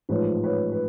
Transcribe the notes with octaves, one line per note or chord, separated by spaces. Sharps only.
A1 G#2 F3 B4 C#5
B4 C#5
B4